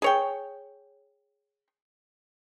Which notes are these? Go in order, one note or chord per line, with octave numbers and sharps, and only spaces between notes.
G#4 C#5 G5